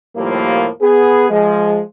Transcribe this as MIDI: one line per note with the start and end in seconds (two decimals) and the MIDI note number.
0.16 0.68 39
0.16 0.68 45
0.16 0.68 53
0.16 0.68 55
0.16 0.68 58
0.82 1.29 59
0.82 1.29 68
1.30 1.80 53
1.30 1.80 56